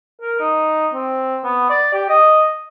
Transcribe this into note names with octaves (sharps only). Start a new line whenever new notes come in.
A#4
D#4
C4
B3
D5
G4
D#5